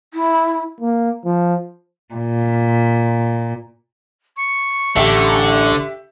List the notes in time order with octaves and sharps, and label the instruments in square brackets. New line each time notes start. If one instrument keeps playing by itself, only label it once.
[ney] E4
[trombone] A#3
F3
[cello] A#2
[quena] C#6
[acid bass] A1 [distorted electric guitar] D3 [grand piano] G4 E5